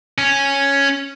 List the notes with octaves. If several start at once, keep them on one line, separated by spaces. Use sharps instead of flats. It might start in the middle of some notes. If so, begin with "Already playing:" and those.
C#4